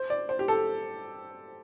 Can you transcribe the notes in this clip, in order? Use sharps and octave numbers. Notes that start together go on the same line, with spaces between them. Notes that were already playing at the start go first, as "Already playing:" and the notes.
Already playing: C5
D5
C5
G4
A4